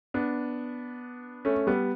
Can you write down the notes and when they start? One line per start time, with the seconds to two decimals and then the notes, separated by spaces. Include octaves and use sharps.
0.14 B3 D4
1.45 A3 C#4
1.67 G3 B3